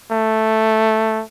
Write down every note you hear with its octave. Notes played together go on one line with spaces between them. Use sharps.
A3